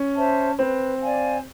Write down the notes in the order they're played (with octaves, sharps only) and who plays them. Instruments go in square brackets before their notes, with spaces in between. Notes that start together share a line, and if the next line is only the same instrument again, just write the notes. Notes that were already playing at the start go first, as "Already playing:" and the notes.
Already playing: [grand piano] C#4
[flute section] C5 E5 A5
[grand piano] C4 [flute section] B4
[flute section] D5 F5 G#5